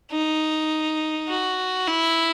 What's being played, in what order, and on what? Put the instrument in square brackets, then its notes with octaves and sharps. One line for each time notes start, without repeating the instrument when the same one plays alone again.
[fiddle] D#4
F#4
E4